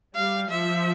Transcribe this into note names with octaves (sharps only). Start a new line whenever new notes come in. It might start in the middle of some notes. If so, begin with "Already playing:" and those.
G3 F5
F3 E5